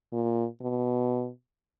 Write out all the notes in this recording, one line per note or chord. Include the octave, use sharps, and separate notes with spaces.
A#2
B2